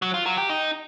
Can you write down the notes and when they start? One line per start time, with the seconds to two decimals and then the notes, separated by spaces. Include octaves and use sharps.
0.02 F#3
0.14 F4
0.26 F#3
0.38 G4
0.50 D#4